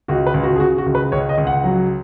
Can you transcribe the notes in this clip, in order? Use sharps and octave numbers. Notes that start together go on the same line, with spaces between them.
C#2 F#4
B4
C#2
F#4
G#4
C#3 F#4
F#4
C#2
B4
C#2 C#5
D#5
C#2
F#5
F#3